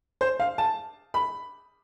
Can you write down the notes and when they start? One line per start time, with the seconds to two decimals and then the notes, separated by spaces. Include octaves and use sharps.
0.21 C5
0.40 F5
0.58 A5
1.14 B5